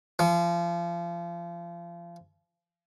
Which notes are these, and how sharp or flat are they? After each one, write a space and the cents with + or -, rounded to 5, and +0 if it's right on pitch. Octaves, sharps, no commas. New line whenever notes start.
F3 -30